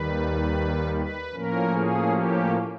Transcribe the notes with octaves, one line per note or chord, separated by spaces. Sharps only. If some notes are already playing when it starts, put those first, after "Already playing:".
Already playing: D#2 D#3 G3 B4
B4
A2 F3 A#3 C#4 A#4
G#4
G4